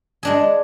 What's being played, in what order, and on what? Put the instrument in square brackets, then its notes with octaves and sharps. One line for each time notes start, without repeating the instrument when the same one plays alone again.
[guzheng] G#3 D4 G#4